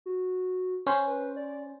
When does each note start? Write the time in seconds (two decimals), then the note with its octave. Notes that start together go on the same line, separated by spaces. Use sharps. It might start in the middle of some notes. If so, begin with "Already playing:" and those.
0.06 F#4
0.87 C#4 C5
1.06 B4
1.36 D5